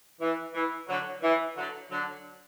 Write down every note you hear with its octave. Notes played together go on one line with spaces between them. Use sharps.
E3
E3
D3 F#3
E3
D3 F#3
D3 F#3